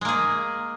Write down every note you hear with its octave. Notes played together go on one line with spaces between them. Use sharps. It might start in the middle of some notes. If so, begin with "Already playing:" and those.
G#3 A#3 G#4